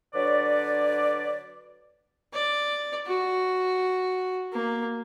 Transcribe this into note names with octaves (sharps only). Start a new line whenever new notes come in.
D3 F#3 B4 C#5 D5
D5
F#4
A#3